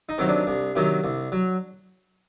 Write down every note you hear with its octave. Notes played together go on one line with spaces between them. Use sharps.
D#4
C3 D#3 F#3
D4
C2
C3 D#3 F#3
C2
F#3